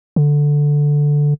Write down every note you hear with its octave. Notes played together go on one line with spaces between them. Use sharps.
D3